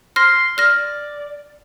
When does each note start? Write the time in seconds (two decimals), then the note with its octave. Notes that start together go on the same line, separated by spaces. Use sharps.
0.16 C6 F6 A#6
0.58 D5 F6 A#6